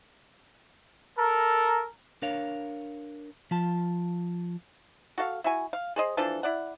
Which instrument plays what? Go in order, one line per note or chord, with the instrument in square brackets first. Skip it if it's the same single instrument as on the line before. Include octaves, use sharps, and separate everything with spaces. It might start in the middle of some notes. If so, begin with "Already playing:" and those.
[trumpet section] A4 A#4
[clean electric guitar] D4 A#4 C#5 F5
F3 F4 A5
[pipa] F#4 A4 F5
E4 F#4 G#5
F5
G#4 C5 D#5
E3 F3 D4 A4
E4 D5 F#5